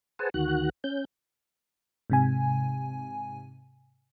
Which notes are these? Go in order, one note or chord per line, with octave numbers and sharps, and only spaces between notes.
G#4 B4 C5 F#5 G#5 A5
D2 D#3 F#4 F#6
C#4 G6
G#2 C3 G#5